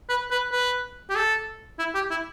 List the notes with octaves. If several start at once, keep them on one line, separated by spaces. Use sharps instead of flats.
B4
B4
B4
G4
A4
E4
G4
E4